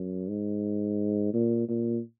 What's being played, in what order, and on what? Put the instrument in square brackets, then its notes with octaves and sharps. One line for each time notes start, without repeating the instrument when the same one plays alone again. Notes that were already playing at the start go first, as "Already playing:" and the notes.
Already playing: [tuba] F#2
G#2
A#2
A#2